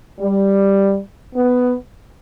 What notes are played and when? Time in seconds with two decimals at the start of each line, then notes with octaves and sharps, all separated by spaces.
0.19 G3
1.34 B3